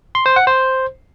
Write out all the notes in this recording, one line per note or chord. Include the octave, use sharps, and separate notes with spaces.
C6
C5
F#5
C5